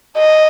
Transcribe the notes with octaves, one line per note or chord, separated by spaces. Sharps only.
D#5